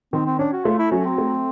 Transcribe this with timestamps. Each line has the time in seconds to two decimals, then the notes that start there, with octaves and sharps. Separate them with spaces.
0.13 D#3 C4
0.26 C4
0.39 C#4 D4
0.53 F#4
0.65 A3 F4
0.79 E4
0.92 F#3 C#4
1.05 C4
1.18 A3